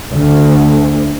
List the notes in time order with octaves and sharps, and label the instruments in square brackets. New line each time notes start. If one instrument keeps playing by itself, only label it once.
[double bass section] D2